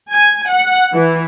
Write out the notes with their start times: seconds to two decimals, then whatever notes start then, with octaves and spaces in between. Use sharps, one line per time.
0.11 G#5
0.49 F#5
0.94 E3